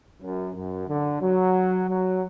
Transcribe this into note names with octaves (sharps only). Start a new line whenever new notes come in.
F#2
F#2
D3
F#3
F#3